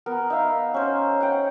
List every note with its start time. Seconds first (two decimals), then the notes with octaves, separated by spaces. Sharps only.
0.06 B3 A#4
0.30 D#4 E5 F5
0.74 C#4 C5
1.21 F#5 G5